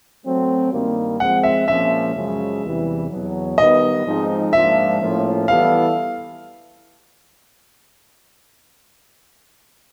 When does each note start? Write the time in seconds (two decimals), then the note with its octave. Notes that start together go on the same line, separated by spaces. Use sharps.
0.24 F#3 A3 C4
0.73 G2 D#3 G3 A#3
1.20 F3 G#3 C4 F#5
1.43 E5
1.68 A#2 F3 G#3 C#4 E5
2.15 F#2 C#3 F3 G#3
2.63 E2 C3 E3 G3
3.10 E2 B2 F#3
3.58 D#3 G3 B3 D#5
4.06 G#2 F3 G#3 C4 D#4
4.53 G#2 F3 A#3 D4 F4 E5
5.01 A2 F3 A#3 C#4 F4
5.48 E3 G3 B3 E4 A4 F5